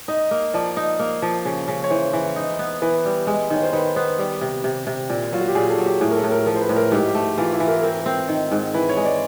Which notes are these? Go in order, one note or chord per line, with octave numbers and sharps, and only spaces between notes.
D#4 D#5
A#3
F3 D5
D#4
A#3
F3
C#3
C#3
C#5
E3 C5
E3
D#4
B3
E3 B4
G3
G#3
D#3 C#5
C5
D#3 B4
B3 C5
G3
C3
C3
C3
A#2
F#3 F4
F#4
G4
A#2 G#4
A4
F#3
G4
A2 G#4
A#4
A4
A2
A#4
F3 A#4
C5
B4
A2
A#4
G#2 G4
G4
A3
E3 F4
E4
E3
A#4
C4 A#4
C4
D#3
G#2
E3 B4
C#5
G#3
D5